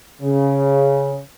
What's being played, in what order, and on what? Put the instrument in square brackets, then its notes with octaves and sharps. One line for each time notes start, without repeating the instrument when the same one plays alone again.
[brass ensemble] C#3